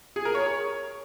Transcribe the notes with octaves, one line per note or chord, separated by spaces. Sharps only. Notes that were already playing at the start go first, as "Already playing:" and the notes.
G#4
A#4
C#5